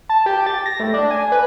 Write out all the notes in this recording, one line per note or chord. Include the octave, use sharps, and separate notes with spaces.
A5
G4
A6
A#6
A2
D4
G#5
B4